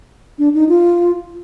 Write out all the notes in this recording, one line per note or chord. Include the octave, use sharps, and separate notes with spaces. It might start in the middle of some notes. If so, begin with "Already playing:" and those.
D4
D#4
F4